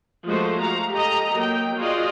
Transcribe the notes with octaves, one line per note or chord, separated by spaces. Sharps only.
F3 G#3 A3 F#4 C5
F#4 F5 A#5
G4 A4 D#5 A#5
F#3 A#3 G5
F4 F#4 G#4 D5 D#5